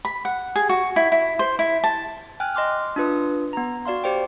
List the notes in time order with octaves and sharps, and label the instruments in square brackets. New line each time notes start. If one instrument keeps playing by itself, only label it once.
[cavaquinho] B5
F#5
G#4
F#4
E4
E4
C5
E4
A5
[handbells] G5 G#5 F6 F#6
D#5 C6 D6 F6
D4 F4 B4 D#6
B3 A#5
F#4 D5 F5 C6
G4 C5 D5 G5